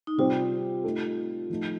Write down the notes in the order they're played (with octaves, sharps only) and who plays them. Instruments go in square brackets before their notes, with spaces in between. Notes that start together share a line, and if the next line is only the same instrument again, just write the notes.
[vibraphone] D#4
[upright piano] C3 G3 C4 G4 C5 [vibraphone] F4
[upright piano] A3 D#4 A4
F3 A3 D#4